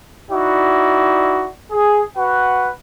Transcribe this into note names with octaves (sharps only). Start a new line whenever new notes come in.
D#4 E4 F#4 D5
G#4
F#4 B4 F#5